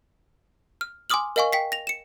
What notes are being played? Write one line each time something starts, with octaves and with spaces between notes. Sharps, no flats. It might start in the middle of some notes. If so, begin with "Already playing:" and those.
F6
G#5 C6 D6 D#6 F6 F#7
A#4 D#5 F5 G#5 C#6
G5 B6 C7
A#6 F7
C#7 E7